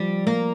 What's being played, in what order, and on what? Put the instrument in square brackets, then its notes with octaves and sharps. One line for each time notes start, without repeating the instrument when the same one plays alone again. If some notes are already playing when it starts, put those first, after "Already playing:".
Already playing: [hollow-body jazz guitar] F3 [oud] G3
[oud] A#3